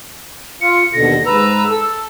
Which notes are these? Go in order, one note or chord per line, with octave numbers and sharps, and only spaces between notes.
F4 C#7
D#2 B2 D3 A#6
G#2 B4 A#5 E6
A4